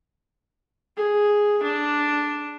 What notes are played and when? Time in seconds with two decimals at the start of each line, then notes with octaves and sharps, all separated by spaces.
0.97 G#4
1.63 D4